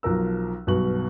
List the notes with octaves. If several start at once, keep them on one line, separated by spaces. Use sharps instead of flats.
B1 F3 A#4 E6
B1 G2 B2 C#6 F#7